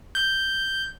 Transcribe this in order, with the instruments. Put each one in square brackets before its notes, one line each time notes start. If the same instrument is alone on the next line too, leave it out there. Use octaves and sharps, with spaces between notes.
[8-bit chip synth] G6